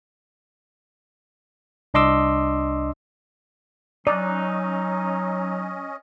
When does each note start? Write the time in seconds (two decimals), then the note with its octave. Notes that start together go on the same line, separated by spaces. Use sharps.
1.94 C2 D4 D#5 C6 D6 E6
4.07 F#3 C#4 D#4 D5 D#5 D#6 F#6